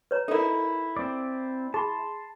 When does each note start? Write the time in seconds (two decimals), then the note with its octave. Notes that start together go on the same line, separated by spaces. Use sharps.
0.11 B4 C#5 A#5
0.28 D#4 E4 A4 A#4
0.97 C4 D5
1.74 G#4 A5 B5 C6